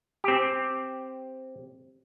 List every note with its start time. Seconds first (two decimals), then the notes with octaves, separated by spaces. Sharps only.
0.24 C4 G4